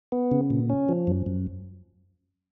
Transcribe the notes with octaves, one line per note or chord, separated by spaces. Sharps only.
B3
C#3
A#2
C#4
F3
F#2
F#2